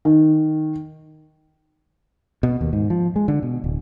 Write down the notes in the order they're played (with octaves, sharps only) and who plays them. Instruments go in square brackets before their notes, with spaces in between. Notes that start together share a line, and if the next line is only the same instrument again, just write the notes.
[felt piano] D#3
[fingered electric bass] B2
D#2
G#2
F3
G#3
D3
B2
D1